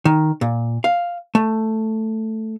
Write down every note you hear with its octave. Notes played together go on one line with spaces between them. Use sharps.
D#3
A#2
F5
A3